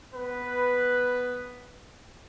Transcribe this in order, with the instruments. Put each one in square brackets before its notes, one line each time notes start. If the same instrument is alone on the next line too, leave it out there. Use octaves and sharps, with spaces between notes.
[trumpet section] B3 B4